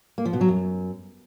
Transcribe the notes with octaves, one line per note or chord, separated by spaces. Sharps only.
A#3
F3
B2
F#3
F#2